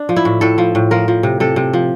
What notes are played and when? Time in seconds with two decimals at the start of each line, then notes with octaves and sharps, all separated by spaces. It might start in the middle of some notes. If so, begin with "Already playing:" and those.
Already playing: D4
0.09 F3
0.16 E4
0.25 A2
0.41 A2 A4
0.58 F3
0.75 A2
0.91 F3 A#4
1.08 F3
1.23 C3
1.40 C3 A4
1.56 C3
1.73 F3